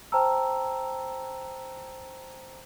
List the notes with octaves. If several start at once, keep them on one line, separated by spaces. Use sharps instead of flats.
C5 G5 A5 A#5 E6